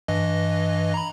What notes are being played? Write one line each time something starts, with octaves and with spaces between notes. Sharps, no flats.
G2 E3 D#5
A#5 B5